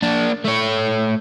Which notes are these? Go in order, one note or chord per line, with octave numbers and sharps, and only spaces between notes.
A#3 D4
A3 C#5